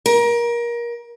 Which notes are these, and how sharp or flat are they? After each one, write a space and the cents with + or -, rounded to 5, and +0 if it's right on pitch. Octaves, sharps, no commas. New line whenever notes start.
A#4 +25